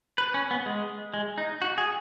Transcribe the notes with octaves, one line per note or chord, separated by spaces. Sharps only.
B4
C#4
B3
G#3
G#3
D#4
F#4
G#4